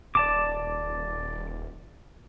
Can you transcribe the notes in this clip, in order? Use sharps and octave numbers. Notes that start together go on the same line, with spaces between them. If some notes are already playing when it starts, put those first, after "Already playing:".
D#1 D5 A5 D6